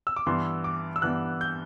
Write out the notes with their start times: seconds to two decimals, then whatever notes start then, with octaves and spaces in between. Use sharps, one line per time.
0.07 E6
0.16 D6
0.27 G2 E3 B3 C6
0.64 D6
0.96 E6
1.02 G2 E3 B3 F#6
1.41 G6